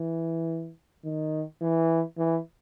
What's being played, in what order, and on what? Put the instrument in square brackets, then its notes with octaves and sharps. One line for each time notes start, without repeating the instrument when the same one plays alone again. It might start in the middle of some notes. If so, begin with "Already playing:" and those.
Already playing: [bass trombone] E3
D#3
E3
E3